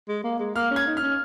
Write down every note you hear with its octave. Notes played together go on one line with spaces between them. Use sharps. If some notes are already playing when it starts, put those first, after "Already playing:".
G#3
A#3
G#3
A#3 F6
C#4
G#6
D#4
F6
C#4